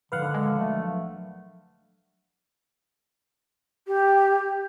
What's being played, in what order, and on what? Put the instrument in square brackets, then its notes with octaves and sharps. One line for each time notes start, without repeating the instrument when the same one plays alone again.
[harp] G#1 A#2 F3 [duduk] D3 [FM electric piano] B4 F5 F#5
[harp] D2 [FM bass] G#3
[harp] F#3 B3 [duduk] A3
[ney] G4